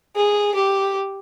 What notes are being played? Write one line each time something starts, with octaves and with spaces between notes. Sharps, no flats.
G#4
G4